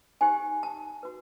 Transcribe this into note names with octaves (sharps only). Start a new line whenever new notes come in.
D#4 G4 C5 G#5
A5
F#4 B4